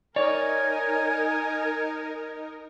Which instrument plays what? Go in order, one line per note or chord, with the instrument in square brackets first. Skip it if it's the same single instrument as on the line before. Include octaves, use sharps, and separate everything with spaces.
[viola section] D#4 A#4 [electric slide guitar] C#5 D5 [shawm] G#5